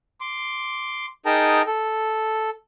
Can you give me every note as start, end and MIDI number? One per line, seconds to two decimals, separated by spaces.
0.21 1.06 84
0.21 1.06 86
1.26 1.62 63
1.26 1.62 68
1.26 1.62 70
1.26 1.62 79
1.26 1.62 81
1.26 1.62 82
1.67 2.50 69